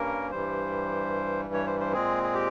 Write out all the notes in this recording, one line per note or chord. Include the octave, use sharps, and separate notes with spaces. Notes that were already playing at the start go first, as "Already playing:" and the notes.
Already playing: G2 G3 A#3 C#4 A#4
G2 E3 G3 C5
C#5
C5
C5
A#2 G#3 C4 G#4
G#4
G4